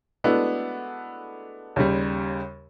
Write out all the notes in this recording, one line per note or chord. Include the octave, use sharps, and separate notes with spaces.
G#3 A3 B3 D4 E4 F#4
D#2 C#3 G3